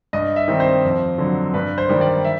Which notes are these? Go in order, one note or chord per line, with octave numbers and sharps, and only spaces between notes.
G2 D#5
E5
D#3 G3 C4
C5
F2
D3 F#3
G2 B4
C5
D#3 G3 A#3
D5
E5